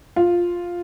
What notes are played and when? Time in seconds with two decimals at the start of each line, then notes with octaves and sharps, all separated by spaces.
0.16 F4